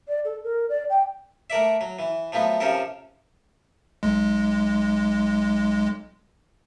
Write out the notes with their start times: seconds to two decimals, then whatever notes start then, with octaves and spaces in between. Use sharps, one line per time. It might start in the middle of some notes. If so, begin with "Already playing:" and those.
0.08 D5
0.25 A4
0.44 A#4
0.69 D5
0.90 G5
1.50 A3 A#4 D5 E5
1.81 F#3
1.99 E3
2.32 F3 F#3 A3 B3
2.60 C3 F3 C#4 A4 A#4
4.03 B1 G#3